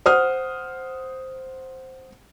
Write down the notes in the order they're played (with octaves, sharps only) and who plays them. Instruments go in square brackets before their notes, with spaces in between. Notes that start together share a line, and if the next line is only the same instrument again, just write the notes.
[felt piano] C5 F#5 D#6 F6